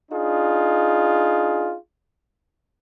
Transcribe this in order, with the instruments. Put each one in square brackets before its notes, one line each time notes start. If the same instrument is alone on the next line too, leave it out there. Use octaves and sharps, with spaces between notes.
[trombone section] D4 D#4 F4 G#4